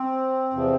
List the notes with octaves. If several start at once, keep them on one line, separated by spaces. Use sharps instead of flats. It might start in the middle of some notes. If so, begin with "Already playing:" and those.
Already playing: C4
E2 C3 F3